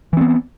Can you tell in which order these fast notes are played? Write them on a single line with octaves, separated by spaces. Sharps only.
E3 C4 B3